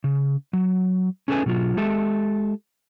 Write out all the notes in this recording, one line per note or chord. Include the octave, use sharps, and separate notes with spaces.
C#3
F#3
C#4 G#4 A4 B4 G#5
B2 F#3 F4
G#3 G4 A4 E5